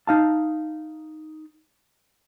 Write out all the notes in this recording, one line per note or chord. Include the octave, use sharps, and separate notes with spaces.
D#4 F5 A5